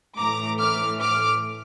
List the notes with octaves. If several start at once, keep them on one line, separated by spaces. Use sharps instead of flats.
A2 E3 A3 A#5 D6
D6 F6
D6 F6